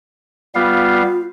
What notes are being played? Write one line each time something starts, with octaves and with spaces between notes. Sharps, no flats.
G3 B3 F4 F5